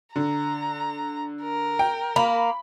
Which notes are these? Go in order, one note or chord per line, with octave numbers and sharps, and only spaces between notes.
D3 A#5
A#4
G5
A#3 B5